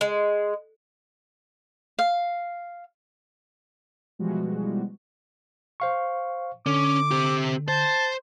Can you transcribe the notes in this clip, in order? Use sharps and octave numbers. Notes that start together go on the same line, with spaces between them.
G#3
F5
B2 E3 F3 G3 G#3 F#4
C5 F5 C#6
D3 C#4 D6
C4 G4
C5 A5